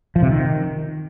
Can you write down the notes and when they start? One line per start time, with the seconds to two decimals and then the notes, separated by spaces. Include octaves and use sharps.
0.16 F3
0.22 C3
0.29 D#3